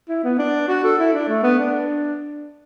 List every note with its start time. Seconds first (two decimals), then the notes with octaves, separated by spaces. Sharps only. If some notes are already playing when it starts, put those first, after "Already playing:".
0.09 E4
0.24 B3
0.38 D4
0.68 F#4
0.84 A4
0.99 E4
1.13 D4
1.29 A3
1.43 B3
1.59 D4